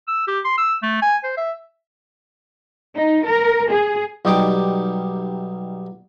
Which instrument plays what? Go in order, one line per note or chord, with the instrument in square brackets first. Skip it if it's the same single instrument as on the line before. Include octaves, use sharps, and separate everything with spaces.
[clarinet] E6
G4
C6
E6
A3
G#5
C5
E5
[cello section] D#4
A#4
G#4
[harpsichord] B1 G3 D#4 G4 D5 D6